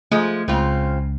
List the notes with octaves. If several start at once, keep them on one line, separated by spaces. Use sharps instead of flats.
F3 G#3 A3
C#2 C#3 C4 F4